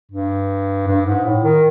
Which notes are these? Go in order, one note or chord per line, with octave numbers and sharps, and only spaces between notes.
G2
G2
G#2
A2
D#3